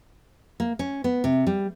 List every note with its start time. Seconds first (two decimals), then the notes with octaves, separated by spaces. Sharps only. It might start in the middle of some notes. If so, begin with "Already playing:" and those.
0.60 A#3
0.79 C#4
1.04 B3
1.24 C3
1.47 G3